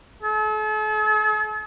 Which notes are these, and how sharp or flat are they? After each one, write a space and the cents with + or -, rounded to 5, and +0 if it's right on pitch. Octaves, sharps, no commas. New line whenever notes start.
A4 -45